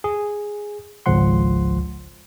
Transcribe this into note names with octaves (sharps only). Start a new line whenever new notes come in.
G#4
G#1 C#2 F3 F#5 C6